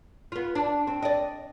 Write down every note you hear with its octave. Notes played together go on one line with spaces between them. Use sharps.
B3 F4
D4
C4
D5 D#5